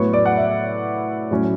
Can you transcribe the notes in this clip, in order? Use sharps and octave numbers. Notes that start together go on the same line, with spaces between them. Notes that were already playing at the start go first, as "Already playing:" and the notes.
Already playing: A2 F#3 B3 C#5
D5
F#5
E5
A2 F#3 C#4